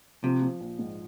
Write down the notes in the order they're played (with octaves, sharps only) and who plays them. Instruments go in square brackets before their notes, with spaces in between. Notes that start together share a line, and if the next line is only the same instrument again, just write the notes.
[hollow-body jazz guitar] C3 [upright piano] F3
[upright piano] F3
A#1
G#2